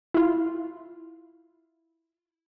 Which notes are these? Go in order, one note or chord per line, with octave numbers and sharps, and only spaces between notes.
E4 F4